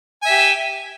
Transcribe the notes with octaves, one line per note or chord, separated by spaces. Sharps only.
G4 E5 G#5